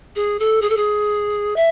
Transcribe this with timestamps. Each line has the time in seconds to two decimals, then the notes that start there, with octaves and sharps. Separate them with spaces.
0.15 G#4
0.39 A4
0.61 G#4
0.70 A4
0.77 G#4
1.56 E5